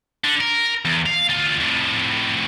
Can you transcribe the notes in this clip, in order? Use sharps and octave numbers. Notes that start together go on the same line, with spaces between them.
D3 D4
A#4
E2
F5
D2 F4
F2 A2